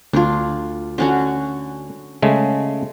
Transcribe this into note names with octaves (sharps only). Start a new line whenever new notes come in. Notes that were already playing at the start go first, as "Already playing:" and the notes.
D2 D4 F4
D3 C#4 F#4
C#3 G#3 A3